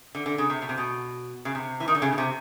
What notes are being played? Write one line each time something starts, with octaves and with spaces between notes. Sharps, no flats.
D3
D3
C#3
C3
B2
C3
B2
C#3
C3
E3
D#3
D3
C#3
B2
C3